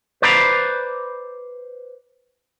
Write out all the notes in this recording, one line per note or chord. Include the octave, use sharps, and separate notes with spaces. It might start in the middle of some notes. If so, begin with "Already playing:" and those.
B4 C5 D5 A#5 B5